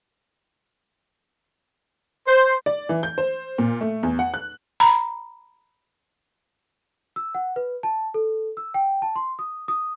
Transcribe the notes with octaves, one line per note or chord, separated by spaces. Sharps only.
C5
D5
E3
G6
C5
A#2
A3
E2
F#5
F#6
A#5 B5
E6
F#5
B4
A5
A4
E6
G5
A5
C6
D#6
D#6